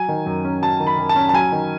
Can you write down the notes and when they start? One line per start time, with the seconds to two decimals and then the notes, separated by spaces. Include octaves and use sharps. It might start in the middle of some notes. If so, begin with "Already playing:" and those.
Already playing: F#3 G#5
0.08 D#3
0.26 F#2
0.45 C#4
0.62 F#3 A5
0.80 D#3
0.87 B5
0.98 F#2
1.09 A5
1.16 C#4
1.29 A5
1.33 F#3 G#5
1.52 D#3